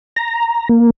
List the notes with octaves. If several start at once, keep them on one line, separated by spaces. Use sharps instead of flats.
A#5
A#3